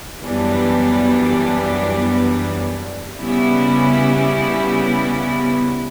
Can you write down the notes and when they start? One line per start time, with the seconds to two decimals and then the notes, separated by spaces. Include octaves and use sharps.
0.22 F#2 E3 G3 B3 D4
3.20 C#3 G3 B3 E4